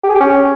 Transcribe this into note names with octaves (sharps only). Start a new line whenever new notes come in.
G4
G#4
G4
C#4